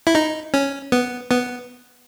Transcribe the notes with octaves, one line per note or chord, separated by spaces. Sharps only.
E4
D#4
C#4
B3
B3